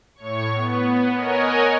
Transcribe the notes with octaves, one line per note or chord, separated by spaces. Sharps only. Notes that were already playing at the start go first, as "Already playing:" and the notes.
A2 C#5 C#6
B3
A#4 C#5 D#5 F#5 G#5